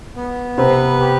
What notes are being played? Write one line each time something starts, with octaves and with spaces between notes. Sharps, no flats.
B3
C3 C4 B4
G4